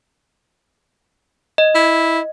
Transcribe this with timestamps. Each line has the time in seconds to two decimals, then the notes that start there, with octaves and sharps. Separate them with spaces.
1.58 D#5
1.75 E4